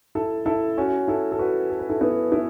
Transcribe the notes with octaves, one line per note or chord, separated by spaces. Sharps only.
E4 A4
E4 A4
C#4 F#4
E4 A4
A4
F#4 B4
A4
B4
E4 A4
B3 E4
B3 E4